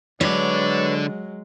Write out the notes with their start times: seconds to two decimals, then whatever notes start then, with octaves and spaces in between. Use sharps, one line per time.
0.21 D3 F#3 G#3 B4 C#5 D5